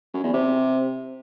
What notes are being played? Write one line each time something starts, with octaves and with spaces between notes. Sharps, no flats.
F#2
E2
C3